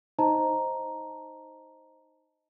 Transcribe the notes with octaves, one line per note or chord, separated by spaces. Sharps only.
D#4 C5 D#5 A5 A#5